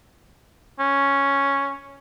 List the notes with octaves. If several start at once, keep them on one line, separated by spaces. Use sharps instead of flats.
C#4